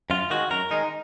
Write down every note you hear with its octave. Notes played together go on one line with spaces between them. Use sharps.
F#2 F4
D#3 G#3 F#4
F#2 A#4
D#3 G#3 D#4